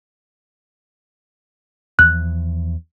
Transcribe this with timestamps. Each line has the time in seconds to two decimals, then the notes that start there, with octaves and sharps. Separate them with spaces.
1.99 E2 F3 F#6